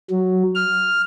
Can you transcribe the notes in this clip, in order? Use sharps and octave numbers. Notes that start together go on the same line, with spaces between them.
F#3
F6